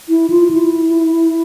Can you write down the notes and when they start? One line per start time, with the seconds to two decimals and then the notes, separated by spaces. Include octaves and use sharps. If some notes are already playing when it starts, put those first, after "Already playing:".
0.09 E4
0.30 F4
0.51 E4